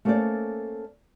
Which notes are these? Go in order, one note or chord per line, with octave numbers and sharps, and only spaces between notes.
A3 A#3 C#4 A4 C5 D5